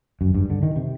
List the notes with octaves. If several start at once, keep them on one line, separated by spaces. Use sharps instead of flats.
F#2
G2
D3
D#3
C3